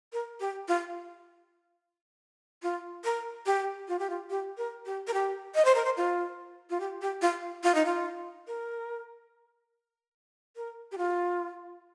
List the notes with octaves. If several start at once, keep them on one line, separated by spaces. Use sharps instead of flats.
A#4
G4
F4
F4
A#4
G4
F4
G4
F4
G4
A#4
G4
A#4
G4
D#5
C5
A#4
C5
F4
F4
G4
G4
F4
F4
D#4
F4
A#4
A#4
G4
F4